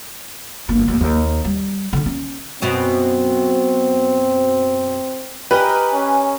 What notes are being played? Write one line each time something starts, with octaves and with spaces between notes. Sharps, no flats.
G1 A#3
D#2 A3
D#2
G3
D3 D#4
C#4
F#2 B2 B3 C4
G4 A#4 B4 D#5 G#5
C#4